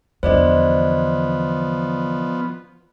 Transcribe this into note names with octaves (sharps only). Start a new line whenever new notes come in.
E2 D3 F3 B3 C5 D5 D#5